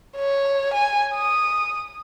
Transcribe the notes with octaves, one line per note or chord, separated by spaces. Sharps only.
C#5
G#5
D#6